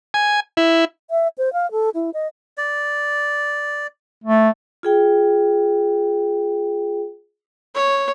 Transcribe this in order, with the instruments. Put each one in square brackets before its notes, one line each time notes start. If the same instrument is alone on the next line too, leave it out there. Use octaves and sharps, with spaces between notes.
[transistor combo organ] G#5
E4
[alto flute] E5
C5
F5
A4
E4
D#5
[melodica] D5
[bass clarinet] A3
[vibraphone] F4 G#4 G5
[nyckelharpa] C#5